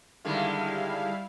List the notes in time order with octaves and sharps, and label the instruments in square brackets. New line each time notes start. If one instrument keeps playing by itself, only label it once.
[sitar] D3 D#3 G#3 [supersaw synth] G3 E4 F5